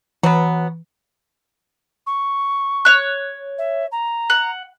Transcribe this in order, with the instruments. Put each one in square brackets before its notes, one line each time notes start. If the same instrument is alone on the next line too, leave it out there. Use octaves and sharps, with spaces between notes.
[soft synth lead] E3 [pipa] F#3 B3
[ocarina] C#6
[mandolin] C#5 F#6
[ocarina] E5
A#5
[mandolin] F#5